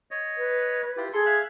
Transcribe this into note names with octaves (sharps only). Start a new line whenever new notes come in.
C#5 D#5
B4
E4 F4 G4
G#4 A4 C6
E5 F5 F#6